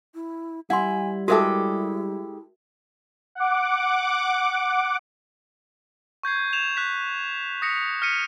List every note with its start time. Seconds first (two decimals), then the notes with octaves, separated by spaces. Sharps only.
0.15 E4
0.70 G3 E4 F#5 G#5 C6
1.28 G#3 E4 F#4 G4 A4 A#4 E5
3.35 F#5 D6
6.23 C#6 G6 G#6 C7
6.53 G#6 E7 F7
6.77 F#6 B6
7.62 D#6 A#6 B6 C#7
8.02 F6 A#6 B6 C#7 D#7